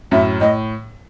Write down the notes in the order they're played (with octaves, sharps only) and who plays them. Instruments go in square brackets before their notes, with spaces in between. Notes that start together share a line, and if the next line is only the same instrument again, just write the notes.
[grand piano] F#2 A2 [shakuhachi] E5
[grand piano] A2 [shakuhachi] D#5